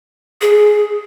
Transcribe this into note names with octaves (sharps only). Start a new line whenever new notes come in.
G#4